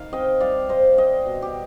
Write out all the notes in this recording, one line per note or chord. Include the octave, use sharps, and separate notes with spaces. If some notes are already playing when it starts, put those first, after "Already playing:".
Already playing: D#3 F5
C4 D#5 G5
G3 D5 F5
C4 C5 D#5
G3 D#5 G5
B2
G4